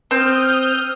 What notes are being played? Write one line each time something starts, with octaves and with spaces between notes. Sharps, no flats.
C4 D#6 F6 G6